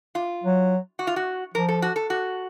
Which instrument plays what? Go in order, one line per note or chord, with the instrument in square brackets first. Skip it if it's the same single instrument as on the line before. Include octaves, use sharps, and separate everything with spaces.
[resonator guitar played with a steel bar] F4
[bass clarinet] F#3
[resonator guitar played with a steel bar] F#4
F4
F#4
[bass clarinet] F3 [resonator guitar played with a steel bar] A#4
[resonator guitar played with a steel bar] A4
F#4
A4
F#4